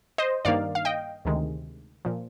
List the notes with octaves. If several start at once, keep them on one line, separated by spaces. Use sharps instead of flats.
C5 D#5
G2 D#3 A#3 D#4 D5 F5
F5
D#5 G5
D2 C3 D#3 G#3
A#2 F3